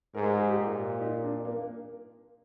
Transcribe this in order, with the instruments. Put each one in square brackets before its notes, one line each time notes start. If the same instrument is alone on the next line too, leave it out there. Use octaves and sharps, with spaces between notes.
[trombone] G#2 [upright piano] A#4
[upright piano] G#4
G#4
G4
[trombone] A#2
[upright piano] D#4
D4
A#3